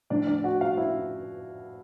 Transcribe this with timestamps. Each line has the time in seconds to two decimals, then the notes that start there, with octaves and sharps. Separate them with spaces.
0.10 A2 F3 D4 D5
0.27 D4 D5
0.44 F#4 F#5
0.61 F4 F5
0.77 E4 E5